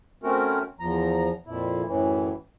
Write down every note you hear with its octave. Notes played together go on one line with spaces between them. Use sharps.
A3 C4 C#4 F#4 A#4
E2 F3 A#5
F2 A#2 E4
F#2 A2 E3